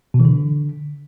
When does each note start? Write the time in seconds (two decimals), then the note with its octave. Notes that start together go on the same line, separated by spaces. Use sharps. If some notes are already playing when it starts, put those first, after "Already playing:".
0.14 B2
0.20 E3
0.25 D3